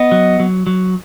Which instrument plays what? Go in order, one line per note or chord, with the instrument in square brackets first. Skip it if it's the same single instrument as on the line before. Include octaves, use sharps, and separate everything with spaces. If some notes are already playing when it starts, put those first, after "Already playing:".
Already playing: [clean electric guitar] B3 [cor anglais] D#5
[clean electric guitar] F#3
F#3
F#3